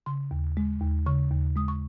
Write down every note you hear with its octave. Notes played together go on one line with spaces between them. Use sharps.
C#3 C6
D#2
G#3
D#2
C#3 C#6
D#2
G#3 D#6
C#6